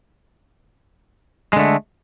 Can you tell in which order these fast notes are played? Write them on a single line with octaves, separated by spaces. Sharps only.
G#3 D3 A3